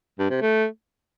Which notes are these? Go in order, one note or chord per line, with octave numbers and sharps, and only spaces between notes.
G2
C3
A3